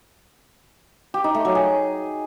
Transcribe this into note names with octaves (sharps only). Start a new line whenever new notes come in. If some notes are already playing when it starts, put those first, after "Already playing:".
G4
D#4
A3
F#3
G#4